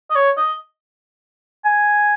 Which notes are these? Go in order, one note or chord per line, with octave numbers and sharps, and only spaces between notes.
D#5
C#5
D#5
G#5